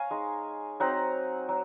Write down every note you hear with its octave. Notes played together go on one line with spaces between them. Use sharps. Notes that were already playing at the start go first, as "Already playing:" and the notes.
Already playing: C#5 F5 G#5 A#5
G#3 D#4
F#3 C4 D#4 F#5 A#5
F#3